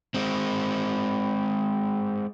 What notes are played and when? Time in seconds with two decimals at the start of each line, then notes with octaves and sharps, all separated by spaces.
0.14 G#3 C4